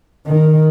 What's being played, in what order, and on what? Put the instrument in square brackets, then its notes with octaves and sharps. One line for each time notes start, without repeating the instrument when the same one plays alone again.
[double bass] D#3